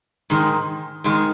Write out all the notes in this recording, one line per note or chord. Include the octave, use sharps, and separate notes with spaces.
G#2 D#3 G#3
G#2 D#3 G#3